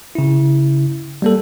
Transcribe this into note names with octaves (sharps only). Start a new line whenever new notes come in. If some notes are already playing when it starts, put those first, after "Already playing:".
C#3 E4
G3 A#3 A4